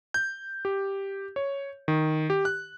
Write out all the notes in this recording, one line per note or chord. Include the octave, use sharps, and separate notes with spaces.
G6
G4
C#5
D#3
G4
F#6